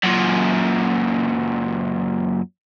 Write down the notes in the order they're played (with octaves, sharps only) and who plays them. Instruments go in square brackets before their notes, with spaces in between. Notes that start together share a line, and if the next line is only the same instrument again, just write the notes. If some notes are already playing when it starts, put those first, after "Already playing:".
[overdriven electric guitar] F#2 A#2